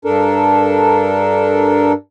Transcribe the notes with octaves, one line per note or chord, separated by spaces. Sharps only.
G2 D4 A4 A#4